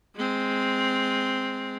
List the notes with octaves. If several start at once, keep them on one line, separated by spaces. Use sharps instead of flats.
G#3 C4